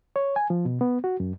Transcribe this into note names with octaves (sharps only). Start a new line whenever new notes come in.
C#5
G#5
F3
B2
B3
F#4
F#2